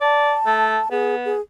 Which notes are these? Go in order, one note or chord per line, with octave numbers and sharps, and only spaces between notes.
D5 A5
A3
B3 G#4
G#4